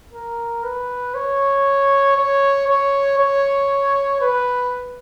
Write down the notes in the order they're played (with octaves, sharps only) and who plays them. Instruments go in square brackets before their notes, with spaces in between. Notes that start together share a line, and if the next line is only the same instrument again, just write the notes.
[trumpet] A#4
B4
C#5
C#5
C#5
C#5
B4